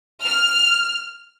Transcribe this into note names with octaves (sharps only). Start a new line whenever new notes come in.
F6